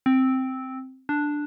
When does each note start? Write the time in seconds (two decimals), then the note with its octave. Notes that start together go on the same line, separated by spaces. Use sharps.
0.06 C4
1.09 D4